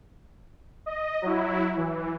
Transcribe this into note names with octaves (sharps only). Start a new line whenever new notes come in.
D#5
F#3 E4
E3